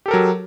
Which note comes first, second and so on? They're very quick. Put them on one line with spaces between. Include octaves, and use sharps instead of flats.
G4 A4 A#4 F#3